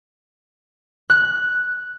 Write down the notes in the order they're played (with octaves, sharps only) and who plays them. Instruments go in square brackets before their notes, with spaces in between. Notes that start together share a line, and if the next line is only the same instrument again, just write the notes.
[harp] F#6